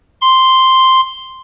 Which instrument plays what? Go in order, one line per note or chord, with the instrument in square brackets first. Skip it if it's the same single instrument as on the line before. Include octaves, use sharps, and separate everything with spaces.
[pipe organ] C6